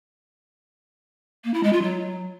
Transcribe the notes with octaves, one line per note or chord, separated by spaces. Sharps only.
A#3
E4
G#3
F4
F#3